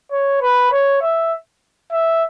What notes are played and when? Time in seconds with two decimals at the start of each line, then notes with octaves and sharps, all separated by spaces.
0.11 C#5
0.41 B4
0.72 C#5
1.02 E5
1.92 E5